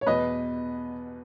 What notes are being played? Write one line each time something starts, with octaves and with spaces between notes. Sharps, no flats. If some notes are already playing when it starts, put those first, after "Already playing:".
C#5
E2 B2 B4 D#5